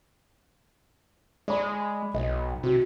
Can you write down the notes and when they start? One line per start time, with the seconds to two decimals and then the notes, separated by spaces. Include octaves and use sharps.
1.48 G#3 D5 B5
2.14 B1 D#5
2.63 C3 F#4